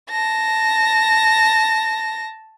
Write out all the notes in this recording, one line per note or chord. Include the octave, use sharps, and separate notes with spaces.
A5 A#6